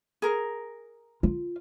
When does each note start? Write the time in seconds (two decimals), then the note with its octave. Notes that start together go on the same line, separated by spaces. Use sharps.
0.22 G#4 A#4
1.23 F4